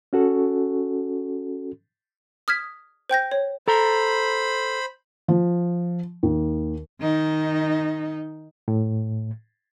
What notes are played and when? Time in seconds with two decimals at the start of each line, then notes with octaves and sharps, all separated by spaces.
0.13 C#4 F#4 A4
2.48 D#6 F6 G#6 B6
3.09 C5 G5 G6 A#6
3.32 C#5
3.68 A4 C5 A#5 B5
5.28 F3
6.23 D#2
7.01 D#3 D#4
8.68 A2